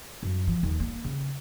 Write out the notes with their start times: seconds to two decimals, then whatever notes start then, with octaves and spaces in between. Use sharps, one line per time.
0.23 F#2
0.47 F3
0.63 D#2
0.80 A#3
1.04 C#3